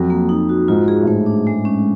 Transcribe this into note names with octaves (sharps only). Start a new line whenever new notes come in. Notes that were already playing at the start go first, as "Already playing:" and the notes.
Already playing: F2 F#3 F#4
A#3
D#4
F#4
G#2 F4
G#4
A2
G#2 A3
D4
G#3
C#4